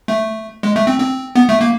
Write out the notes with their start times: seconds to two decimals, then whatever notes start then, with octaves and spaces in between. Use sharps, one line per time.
0.08 A3
0.63 G#3
0.76 A3
0.87 C4
1.00 C4
1.36 B3
1.49 A3
1.61 A#3